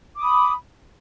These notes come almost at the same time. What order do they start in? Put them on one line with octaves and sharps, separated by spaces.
D6 D#6 B5